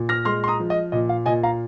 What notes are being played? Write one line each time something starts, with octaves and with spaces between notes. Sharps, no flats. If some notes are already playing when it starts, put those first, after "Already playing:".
Already playing: A#2
F6 A#6
G#3 C6 F6
C6
A#5 D#6
F3
D#5
A#2 D#5
F5
A#2 D#5 G#5
F5 A#5